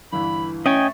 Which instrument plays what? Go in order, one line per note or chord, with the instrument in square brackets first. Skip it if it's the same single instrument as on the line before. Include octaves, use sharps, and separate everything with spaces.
[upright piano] G1 E3 [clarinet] B5
[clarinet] A3 [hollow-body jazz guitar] C#4 [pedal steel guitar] D#5 G5 G#5